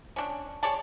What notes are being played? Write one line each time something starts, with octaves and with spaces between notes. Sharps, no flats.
C#4 D4
G#4 C#5 D5 A5